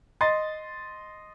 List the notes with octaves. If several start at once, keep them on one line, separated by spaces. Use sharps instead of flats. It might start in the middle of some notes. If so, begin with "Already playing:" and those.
D#5 C6 A6